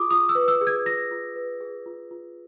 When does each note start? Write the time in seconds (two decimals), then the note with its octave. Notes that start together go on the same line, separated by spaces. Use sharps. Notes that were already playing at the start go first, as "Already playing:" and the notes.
Already playing: F4 G#4 D6 D#6
0.11 F4 D#6
0.29 E6
0.35 B4
0.48 E6
0.61 G#4
0.67 G#6
0.86 F4 A#6
1.11 F4
1.36 B4
1.61 G#4
1.86 F4
2.11 F4